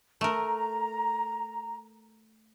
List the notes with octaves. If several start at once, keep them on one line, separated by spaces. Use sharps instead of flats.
A3 A#4 A#5